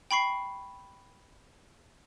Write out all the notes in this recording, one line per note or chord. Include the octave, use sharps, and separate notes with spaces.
G5 B5 C#6 C7